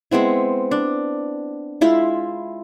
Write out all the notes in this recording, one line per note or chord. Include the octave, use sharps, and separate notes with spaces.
G#3 B3 C4 E4
D4
G#3 E4 F4